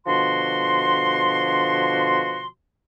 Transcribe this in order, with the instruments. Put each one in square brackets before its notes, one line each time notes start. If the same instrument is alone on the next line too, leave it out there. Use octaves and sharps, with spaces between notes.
[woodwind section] B2 D3 F3 F#4 C6